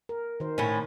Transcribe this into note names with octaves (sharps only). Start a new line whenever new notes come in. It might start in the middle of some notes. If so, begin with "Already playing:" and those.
A#4
D#3 C5
A2 C#4